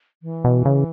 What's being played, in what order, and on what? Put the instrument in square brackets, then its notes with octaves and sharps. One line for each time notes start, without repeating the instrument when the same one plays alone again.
[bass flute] E3
[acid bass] B2
C#3